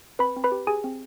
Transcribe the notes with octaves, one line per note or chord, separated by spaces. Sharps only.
C4 B4 B5
C4
B4 B5
G4
G4 G#4 G#5
C4